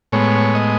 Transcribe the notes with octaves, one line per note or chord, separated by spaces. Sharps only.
A2 G#3 B3 C#5
D#5